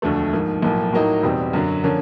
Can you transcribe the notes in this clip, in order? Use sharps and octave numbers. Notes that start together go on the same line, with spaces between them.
E1 D2 D3 F3 A3
G#2 F3 A#3
B1 A2 F3 A#3
A2 F#3 A#3 D#4
E2 B2 G3 C4
F#2 D3 F#3
D3 F3 A#3 C#4